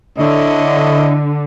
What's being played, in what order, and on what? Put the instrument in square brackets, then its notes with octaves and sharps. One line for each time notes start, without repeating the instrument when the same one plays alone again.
[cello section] D3 [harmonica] E4 C#5 D#5